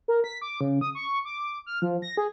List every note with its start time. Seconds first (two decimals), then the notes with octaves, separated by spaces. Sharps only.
0.08 A#4
0.24 B6
0.42 D6
0.61 C#3
0.81 D#6
0.95 C#6
1.25 D6
1.66 F6
1.82 F3
2.02 A#6
2.17 G#4